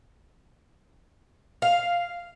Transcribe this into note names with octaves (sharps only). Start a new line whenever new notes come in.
F5